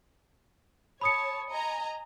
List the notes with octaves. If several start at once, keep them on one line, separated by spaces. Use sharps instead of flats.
C#5 A5 B5 D#6 C#7
D#5 G#5 A#5